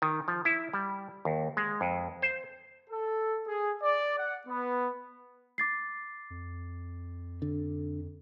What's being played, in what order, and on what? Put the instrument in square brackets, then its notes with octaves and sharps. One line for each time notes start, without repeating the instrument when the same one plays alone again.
[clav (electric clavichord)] D#3
F3
E4
G3
D#2
G#3
F2
C5
[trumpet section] A4
G#4
D5
F#5
B3
[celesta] D6 A6 C7
[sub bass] F2
[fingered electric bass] D3